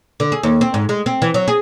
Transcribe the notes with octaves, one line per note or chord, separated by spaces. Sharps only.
D3
G#4
D#2
C4
G#2
G#3
C4
E3
F#3
G#4